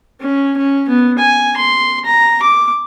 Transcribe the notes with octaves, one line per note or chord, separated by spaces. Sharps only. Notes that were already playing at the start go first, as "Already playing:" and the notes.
C#4
C#4
B3
G#5
C6
A#5
D6